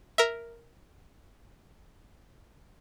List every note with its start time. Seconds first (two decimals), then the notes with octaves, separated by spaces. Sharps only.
0.18 A#4 E5